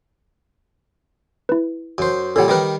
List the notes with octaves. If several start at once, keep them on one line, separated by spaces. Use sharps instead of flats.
E4 B4
F#2 C5
A#2 G3 A4 C#5 F#5
D#3 G3 A#4 B4 G5